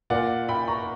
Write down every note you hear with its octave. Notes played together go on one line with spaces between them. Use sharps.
A#2 A#3 D5 F#5
G5 B5
A#5 C#6